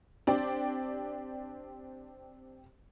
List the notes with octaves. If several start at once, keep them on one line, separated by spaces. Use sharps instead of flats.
C4 D4 G4 D5